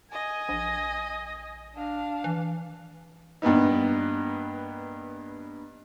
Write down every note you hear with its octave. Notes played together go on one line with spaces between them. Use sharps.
D#5 G#5
A#1
D4 F5
E3
G2 A#2 B3 D#4